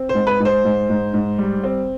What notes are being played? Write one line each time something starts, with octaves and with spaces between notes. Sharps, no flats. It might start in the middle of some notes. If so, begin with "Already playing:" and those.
Already playing: C4
C5
G#2
B4
G#2 C5
G#2
G#2
G#2
G3
C4